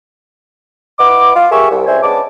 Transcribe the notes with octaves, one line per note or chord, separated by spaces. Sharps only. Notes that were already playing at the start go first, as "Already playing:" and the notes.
E3 B4 D#5 F#5 D6
F4
G4 G#4 A#4 E5 C#6
C2
C#2 C3 G3 C5 E5 G#5
G#3 B3 C#4 D4 A5 D6